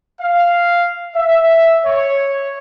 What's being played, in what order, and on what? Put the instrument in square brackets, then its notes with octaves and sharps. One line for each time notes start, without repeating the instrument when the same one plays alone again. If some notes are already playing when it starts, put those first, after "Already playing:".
[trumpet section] F5
E5
C#5